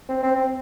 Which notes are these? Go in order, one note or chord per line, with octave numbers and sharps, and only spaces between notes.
C4
C4
C4